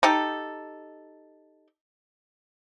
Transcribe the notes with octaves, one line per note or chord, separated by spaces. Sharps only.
D#4 G4 A4